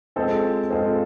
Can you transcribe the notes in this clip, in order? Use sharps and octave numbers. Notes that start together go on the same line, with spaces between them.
G#3 C4 F4 A4 C5
G#3 C4 F4 A4 C5